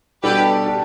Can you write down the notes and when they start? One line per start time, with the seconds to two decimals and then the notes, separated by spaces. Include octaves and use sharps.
0.23 B2 G3 D4 G4 A4 B4
0.66 D4 G4